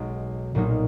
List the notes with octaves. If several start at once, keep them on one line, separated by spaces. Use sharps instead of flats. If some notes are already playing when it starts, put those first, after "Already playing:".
Already playing: B1 B2 G#3
B1 A#2 F#3 A#3 D#4